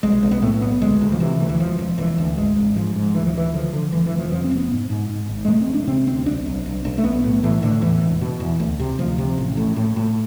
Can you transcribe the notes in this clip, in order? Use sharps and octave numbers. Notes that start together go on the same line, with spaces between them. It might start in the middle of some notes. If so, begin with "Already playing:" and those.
B1 G#3
B1
B3
A2 A3
B1 B3
D2 G#3
D2
F3
C3 E3
D2
E3
E1 F3
E1
E1 E3
D2
G#1 G#3
G#1
G#2 F3
G#2
D2 E3
F3
D3
E3
D3 F3
D3
F1 E3
E3
F1
F3
F2 F3
C4
F1
B3
G#2
G#2
G#2
G#1
G#3
E1 A3
C4
E1
D4
C3 C4
D2 C4
B1 D4
B1
B1
B1
A3
B1 B3
A2
A2 E3
A2 D3
E2 E3
E1
B2
E2
D2
C3
D2 F3
C3
A1
A2
A2
A2